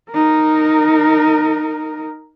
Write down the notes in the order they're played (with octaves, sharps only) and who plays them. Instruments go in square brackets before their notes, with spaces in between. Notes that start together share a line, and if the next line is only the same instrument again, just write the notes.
[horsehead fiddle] D#4 A#4